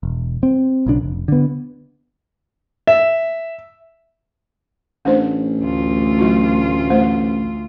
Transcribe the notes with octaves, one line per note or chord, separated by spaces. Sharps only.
E1
C4
B1 C#3 D4
F1
D3 B3
E5
A1 A3 D4 C5
D2 F4
F#3 E4 F#4
A3 C5